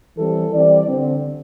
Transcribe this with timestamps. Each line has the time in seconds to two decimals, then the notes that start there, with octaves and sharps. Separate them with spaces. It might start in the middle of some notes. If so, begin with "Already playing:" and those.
0.17 E3 G3 C4 A4
0.53 E3 G3 C4 D5
0.89 D3 C4